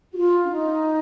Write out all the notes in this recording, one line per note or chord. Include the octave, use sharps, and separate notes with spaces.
F#4
F4
D4
D#4